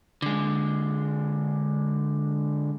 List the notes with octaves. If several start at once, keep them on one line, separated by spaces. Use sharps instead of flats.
D3 G#3